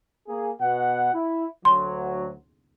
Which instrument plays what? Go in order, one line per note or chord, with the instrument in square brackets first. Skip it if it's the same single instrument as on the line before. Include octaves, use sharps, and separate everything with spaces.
[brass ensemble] A#3 G#4
B2 F#5
E4
[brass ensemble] D2 F#3 [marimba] C6